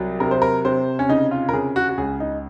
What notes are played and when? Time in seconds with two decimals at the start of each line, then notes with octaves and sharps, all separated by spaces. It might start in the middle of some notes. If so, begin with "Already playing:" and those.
Already playing: C2 F#3
0.20 C3 A#4
0.31 C5
0.42 A#4
0.65 C3 C5
0.99 C#4
1.09 C#3 D#4
1.31 F4
1.49 A#4
1.53 C#3 G#4
1.76 F#4
1.89 F#4
1.98 C#2 G#4
2.20 D#4